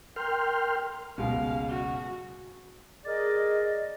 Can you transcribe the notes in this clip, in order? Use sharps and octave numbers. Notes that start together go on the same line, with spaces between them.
A#4 G5 C6 F6
F#1 C#2 B2 G#3 F5
F#4
G#4 A#4 D5 D#5